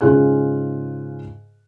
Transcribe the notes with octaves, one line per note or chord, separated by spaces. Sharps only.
G#2 C#3 F4 G#4 F#6